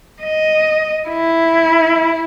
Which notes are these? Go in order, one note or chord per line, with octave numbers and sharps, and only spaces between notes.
D#5
E4